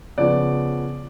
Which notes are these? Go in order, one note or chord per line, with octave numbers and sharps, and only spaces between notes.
C#3 F3 B3 D5